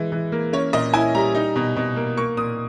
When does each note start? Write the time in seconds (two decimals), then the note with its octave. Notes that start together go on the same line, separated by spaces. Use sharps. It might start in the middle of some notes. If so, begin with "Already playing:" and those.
Already playing: E3 G#3 E4
0.12 E3
0.32 A#3
0.53 C#4 C#5
0.73 A#2 D#5
0.94 E4 G#5
1.15 G3 A#5
1.35 D#4
1.56 B2
1.76 B2
1.96 A#3
2.17 A#3 C#6
2.37 A#2 D#6